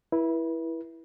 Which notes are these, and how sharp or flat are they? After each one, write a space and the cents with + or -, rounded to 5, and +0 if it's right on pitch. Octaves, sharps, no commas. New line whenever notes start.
E4 +0 B4 -30